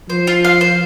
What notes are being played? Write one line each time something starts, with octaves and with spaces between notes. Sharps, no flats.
F3 C5
F4
F5
C5